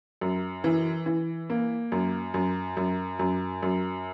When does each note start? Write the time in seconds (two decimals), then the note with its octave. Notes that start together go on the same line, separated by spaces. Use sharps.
0.21 F#2
0.64 E3
1.06 E3
1.50 A#3
1.92 F#2
2.34 F#2
2.77 F#2
3.19 F#2
3.63 F#2